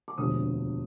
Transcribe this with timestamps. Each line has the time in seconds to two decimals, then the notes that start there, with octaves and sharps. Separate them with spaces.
0.08 D6
0.18 E1 D2 C3 F3 D#6